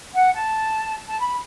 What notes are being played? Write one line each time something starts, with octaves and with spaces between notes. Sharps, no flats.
F#5
A5
A5
B5